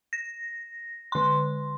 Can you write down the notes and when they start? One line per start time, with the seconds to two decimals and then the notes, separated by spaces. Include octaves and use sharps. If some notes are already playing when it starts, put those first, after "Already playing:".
0.13 A#6
1.12 D3 C6